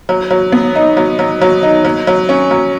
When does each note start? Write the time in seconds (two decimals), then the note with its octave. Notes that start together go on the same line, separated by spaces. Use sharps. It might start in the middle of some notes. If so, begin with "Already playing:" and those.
0.09 F#3
0.31 F#3
0.52 B3
0.75 D#4
0.97 F#3
1.19 F#3
1.41 F#3
1.63 D#4
1.85 F#3
2.07 F#3
2.29 C#4
2.51 F#3